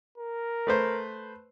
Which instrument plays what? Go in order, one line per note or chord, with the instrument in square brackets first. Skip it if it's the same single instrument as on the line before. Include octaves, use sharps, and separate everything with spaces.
[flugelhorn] A#4
[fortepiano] A3 B4 C5